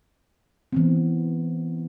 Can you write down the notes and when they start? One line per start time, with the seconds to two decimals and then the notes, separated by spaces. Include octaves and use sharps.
0.73 E3 B3 C4